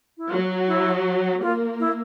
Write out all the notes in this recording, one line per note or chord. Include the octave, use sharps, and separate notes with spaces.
E4
F#3 F4
F#4
E4
A#3 F4
E4